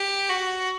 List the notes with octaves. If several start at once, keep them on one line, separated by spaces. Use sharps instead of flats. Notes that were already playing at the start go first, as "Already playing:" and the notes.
Already playing: G4
F#4